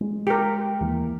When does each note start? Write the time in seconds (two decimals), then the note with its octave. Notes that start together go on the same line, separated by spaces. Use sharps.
0.01 G#3
0.27 G4 A#4
0.80 D#2 E3 A#3